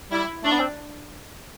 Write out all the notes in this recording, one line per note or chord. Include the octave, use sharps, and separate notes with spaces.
G3 E4
A3 D4
B3
C4